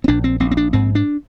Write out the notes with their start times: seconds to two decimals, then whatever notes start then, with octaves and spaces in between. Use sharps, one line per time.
0.04 C4
0.08 A#1 D4
0.24 C4
0.40 A#1 C4
0.51 C4
0.57 D4
0.73 G#2 C4
0.95 D4